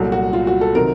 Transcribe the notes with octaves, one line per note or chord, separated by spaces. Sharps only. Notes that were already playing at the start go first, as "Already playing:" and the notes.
Already playing: C2 A#2 F#3 A4
F#4
F4
F#4
A4
C3 D#3 F#3 A#4